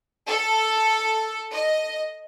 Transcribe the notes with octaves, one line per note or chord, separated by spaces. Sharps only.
A4
D#5